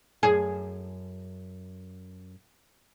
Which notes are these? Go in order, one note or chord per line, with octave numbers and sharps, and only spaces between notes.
F#2 G#4